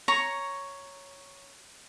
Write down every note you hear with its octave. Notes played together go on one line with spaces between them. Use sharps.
C#5 A#5 C#6